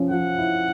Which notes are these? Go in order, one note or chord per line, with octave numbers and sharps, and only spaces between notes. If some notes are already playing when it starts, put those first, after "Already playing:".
Already playing: F3 C#4
F3 F#5
E4